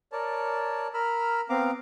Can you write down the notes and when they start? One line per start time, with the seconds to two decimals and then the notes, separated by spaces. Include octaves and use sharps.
0.12 A#4 C#5 D5 A5
0.94 A#4 A#5 B5 E6 F6
1.49 B3 C4 F5 A#5 D6